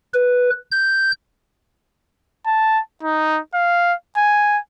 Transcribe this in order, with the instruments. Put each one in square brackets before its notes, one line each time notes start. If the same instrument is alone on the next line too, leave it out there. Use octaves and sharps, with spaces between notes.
[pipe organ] B4
G6
[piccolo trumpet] A5
D#4
F5
G#5